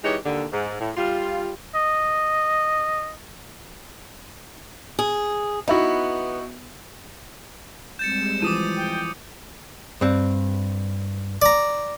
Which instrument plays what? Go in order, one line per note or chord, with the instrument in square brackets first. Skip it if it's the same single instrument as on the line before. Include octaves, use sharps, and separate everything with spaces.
[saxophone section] E3 G#3 D#4 G4 C#5
D#2 D3
G#2
A2
G3 F4
[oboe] D#5
[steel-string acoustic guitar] G#4
[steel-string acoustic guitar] B3 [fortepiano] D#4 E4 F#4
[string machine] G3 G#3 C4 [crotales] G6 A6 C#7 [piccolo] E7
[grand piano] E3 F3 [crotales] D6 D#6 D#7
[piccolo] G5
[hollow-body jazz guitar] G2 C4
[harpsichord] D5 A#5